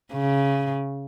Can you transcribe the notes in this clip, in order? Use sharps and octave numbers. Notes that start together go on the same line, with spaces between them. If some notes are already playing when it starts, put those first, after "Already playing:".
C#3